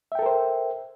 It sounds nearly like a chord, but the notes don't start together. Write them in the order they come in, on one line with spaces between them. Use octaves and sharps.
E5 G5 A4 A#4 C5